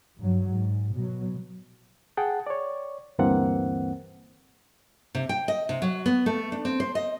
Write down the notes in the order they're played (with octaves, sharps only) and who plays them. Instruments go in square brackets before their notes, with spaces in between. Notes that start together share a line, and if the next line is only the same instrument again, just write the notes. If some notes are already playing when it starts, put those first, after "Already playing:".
[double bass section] G2 F#3
G#2
B2 F#3
[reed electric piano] G#4 F#5 G5 A5
C#5 D5
D2 G2 E3 A#3 C4 F#5
[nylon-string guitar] C3
G5
D#5
C3
F#3
B3
A3
D4
C4
C5
D#5